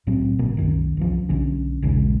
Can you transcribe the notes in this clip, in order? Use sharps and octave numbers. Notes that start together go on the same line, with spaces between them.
C2 A2 F#3 C4
G#1 B2 A#3
C2 F#2 D#3
C2 E3 F3
B1 D3 C#4
A#1 D#2 C#3 G#3